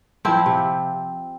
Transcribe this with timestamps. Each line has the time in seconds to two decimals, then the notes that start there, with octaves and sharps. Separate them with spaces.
0.25 F3 C4 E4
0.46 C3